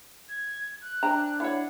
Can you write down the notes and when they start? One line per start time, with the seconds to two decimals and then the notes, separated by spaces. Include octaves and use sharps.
0.29 G#6
0.82 F#6
1.03 D4 C5 G5 A#5
1.40 E4 C#5 F#5